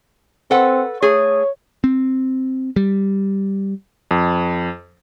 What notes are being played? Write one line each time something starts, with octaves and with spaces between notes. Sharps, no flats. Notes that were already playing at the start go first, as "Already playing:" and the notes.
C4 A4 B4 F#5
A3 G#4 C#5
C4
G3
F2